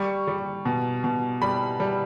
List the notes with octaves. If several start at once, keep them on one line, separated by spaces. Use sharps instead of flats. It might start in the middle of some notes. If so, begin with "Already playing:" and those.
Already playing: G3 C#6
G3
B2
B2
G3 B5
G3